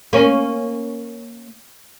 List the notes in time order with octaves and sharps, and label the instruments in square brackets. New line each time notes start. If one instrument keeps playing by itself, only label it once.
[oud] A#3 C#4